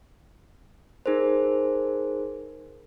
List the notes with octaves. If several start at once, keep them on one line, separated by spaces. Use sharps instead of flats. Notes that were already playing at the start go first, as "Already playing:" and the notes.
D#4 G#4 A#4 C5